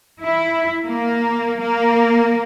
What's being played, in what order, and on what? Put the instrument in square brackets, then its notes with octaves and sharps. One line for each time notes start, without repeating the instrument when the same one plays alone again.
[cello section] E4
A#3
A#3